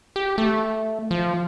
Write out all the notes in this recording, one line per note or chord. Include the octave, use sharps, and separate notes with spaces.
G4
A3
F3